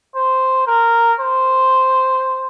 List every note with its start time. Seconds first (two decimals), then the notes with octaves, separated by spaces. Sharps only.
0.15 C5
0.67 A#4
1.19 C5